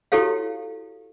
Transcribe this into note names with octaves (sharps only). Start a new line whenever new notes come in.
E4 F#4 G4 A4 C#5 F5